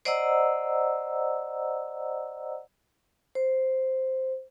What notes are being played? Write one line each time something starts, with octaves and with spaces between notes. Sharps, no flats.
C5 D5 D#5 F#5 A#5 E6
C5